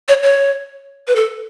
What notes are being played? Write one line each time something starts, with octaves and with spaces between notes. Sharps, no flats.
C#5
C#5
B4
A4